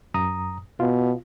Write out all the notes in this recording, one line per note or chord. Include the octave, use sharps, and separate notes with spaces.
F#2 A#5 D#6
B2 F4